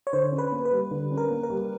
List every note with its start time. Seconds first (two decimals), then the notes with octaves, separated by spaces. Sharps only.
0.07 C#5
0.13 D3 C5
0.32 C#4
0.38 B4
0.52 A#3
0.65 B4
0.72 G3
0.91 D3
1.11 C#4
1.17 A#4
1.30 A#3
1.43 A#4
1.50 G3